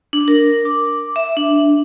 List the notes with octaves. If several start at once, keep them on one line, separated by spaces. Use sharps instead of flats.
D4
A#4
D6
E5
D4